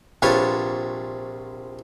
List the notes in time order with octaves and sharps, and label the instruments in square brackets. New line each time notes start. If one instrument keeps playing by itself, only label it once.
[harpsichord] A#1 C3 F4 B4 C#5 A5